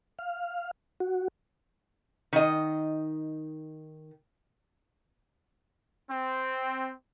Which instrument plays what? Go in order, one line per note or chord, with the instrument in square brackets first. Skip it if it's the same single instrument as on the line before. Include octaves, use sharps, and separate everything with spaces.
[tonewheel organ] F5
F#4
[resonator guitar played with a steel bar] D#3 D#5
[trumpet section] C4